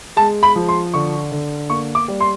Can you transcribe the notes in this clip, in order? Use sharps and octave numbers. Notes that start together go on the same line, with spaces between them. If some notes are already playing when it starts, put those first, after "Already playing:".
G#3 A5
B5
F3
C6
D3 C#6
D3
A#3 C#6
D6
G3
C6